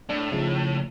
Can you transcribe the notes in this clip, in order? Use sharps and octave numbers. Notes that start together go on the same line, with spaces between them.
A2 D4
C#3 F3 D#4